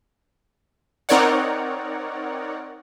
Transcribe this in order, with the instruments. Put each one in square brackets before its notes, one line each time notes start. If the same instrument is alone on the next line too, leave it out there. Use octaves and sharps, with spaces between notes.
[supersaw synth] C4 D#4 A#4 C#5 D5 F#5